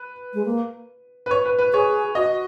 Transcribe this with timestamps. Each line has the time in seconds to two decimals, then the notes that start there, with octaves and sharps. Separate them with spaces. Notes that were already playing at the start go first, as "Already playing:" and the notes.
Already playing: B4
0.34 G#3
0.45 A#3
1.26 B4
1.31 C#5
1.45 B4
1.59 B4
1.73 G#4 C#5
2.15 F#4 D#5